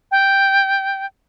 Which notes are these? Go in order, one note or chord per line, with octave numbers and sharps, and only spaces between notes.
G5